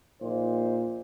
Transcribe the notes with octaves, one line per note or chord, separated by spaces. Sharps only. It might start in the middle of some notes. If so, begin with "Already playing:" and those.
A#1 A#2 D#4 C5